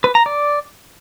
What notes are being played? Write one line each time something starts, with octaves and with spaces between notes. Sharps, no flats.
B4
A#5
D5